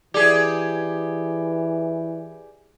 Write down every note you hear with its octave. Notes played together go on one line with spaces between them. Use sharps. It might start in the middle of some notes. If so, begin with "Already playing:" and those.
E3 G4 G#4 D5